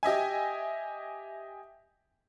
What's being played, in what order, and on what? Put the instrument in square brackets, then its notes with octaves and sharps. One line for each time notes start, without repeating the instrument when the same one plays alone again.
[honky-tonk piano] G4 D#5 E5 G#5